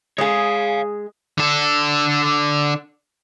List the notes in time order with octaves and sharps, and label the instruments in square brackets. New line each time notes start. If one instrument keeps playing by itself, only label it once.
[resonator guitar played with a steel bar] G#3 G#4 [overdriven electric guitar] C#5 F5
[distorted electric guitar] D3 A4